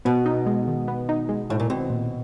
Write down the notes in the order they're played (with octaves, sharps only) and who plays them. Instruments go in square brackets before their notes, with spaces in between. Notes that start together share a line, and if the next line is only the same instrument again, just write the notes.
[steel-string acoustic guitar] B2 [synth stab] B3
[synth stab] D#4
G#3
D#3
B3
D#4
G#3
[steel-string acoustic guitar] A2 [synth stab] D#3
[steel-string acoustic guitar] A#2
[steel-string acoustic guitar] B2 [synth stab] C4
[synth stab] A#2